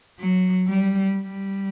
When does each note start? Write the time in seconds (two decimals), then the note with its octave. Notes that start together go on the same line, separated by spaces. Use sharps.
0.20 F#3
0.68 G3
1.15 G3